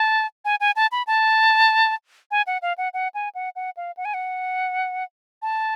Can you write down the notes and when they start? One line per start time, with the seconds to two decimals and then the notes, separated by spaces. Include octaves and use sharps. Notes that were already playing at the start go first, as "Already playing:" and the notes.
Already playing: A5
0.45 G#5
0.60 G#5
0.76 A5
0.92 B5
1.07 A5
2.31 G#5
2.47 F#5
2.62 F5
2.78 F#5
2.94 F#5
3.14 G#5
3.35 F#5
3.56 F#5
3.77 F5
3.97 F#5
4.05 G#5
4.14 F#5
5.42 A5